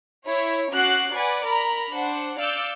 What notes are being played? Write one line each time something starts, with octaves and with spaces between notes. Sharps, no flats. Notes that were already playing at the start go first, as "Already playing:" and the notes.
E4 C#5
C#4 F#4 D6 F#6 C7
B4 D5 F#5 G#5
A#4 A#5 B5
D4 C5 F#5
D5 F5 E6 G6 C#7